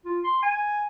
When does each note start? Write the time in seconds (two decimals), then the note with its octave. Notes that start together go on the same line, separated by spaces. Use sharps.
0.05 F4
0.24 C6
0.42 G#5